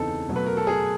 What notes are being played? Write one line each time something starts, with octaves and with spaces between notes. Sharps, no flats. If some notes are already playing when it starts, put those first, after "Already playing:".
Already playing: E2 C#3 E3 C4 D#4 A4
B2 F#3 A3
B4
A#4
A4
G#4